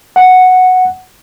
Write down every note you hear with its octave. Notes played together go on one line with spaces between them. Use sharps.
F#5